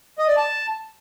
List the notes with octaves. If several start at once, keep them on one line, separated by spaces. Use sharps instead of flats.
D#5
D5
A5